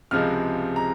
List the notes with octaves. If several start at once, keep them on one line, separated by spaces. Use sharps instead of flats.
C#2 C3 F3 G#3 F6
A#5